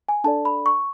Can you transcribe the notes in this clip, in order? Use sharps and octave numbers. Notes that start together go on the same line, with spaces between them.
G#5
D4 A4 D5 A5
B5
C#6